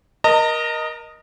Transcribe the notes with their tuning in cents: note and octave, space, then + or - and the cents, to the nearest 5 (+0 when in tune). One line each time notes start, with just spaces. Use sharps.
A#4 +20 D#5 +0 A#5 -45